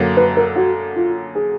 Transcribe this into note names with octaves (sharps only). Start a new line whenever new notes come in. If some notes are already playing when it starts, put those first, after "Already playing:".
Already playing: F#2 D3 F#3 A#3
B4
A#4
F#4
F4
G#4